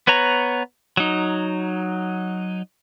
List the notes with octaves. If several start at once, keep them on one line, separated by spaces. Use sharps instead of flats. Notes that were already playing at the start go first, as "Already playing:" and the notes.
B3 B4 C#5 A#5
F#3 D#4